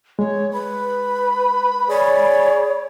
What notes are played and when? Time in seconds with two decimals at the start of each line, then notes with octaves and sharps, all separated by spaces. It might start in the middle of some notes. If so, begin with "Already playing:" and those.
0.19 G#3 C#5
0.53 B4 B5
1.89 G#4 C#5 D5